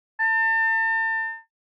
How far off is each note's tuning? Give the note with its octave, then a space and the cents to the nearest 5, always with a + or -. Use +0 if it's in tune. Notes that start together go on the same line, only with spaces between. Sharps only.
A5 +40